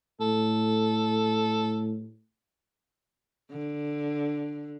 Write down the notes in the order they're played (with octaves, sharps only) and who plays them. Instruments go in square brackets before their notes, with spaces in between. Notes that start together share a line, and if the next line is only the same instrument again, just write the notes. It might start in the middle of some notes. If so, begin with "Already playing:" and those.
[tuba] A2 [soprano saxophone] A4
[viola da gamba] D3